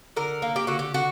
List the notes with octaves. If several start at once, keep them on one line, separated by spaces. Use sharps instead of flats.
D3 A#4
A#3
G4
D3 F#4
G4
D3 F#4